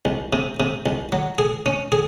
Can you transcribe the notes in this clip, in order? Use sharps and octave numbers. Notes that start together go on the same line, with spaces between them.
C2
C3
C3
C2
F#3
G#4
C#4
G#4